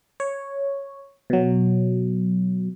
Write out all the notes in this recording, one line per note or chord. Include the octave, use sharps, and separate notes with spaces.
C#5
B2 F#3